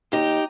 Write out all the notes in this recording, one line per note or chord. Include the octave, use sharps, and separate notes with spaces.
D#2 D#4 G4